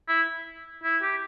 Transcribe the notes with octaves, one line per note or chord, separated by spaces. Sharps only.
E4
E4
G4